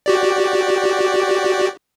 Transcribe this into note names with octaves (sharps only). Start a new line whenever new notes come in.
F#4 G4 D5